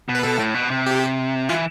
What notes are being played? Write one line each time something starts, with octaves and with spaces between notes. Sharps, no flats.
B2
B4
B2 A4
A2
B2
C3
G4
E3 F4